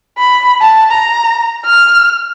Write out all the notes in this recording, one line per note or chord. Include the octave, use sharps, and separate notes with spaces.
B5
A5
A#5
F6